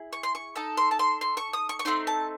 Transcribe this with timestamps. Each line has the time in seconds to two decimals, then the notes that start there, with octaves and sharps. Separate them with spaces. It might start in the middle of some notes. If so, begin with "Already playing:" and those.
Already playing: E4 G#4
0.13 C#6
0.23 C6
0.35 C#6
0.55 D#4 A4 A5
0.77 C6
0.91 A5
0.99 C6
1.21 C6
1.37 C#6
1.53 D#6
1.69 C#6
1.79 C#6
1.85 A3 C4 D#4 C6
2.07 A5